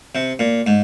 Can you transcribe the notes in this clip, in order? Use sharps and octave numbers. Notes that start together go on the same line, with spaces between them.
C3
A#2
G#2